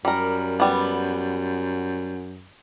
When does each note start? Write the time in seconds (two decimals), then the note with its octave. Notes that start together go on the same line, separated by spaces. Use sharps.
0.05 F#2 G3 A#4
0.60 G3 B3